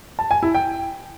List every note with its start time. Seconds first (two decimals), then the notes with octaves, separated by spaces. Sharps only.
0.19 A5
0.31 G#5
0.43 E4
0.55 G5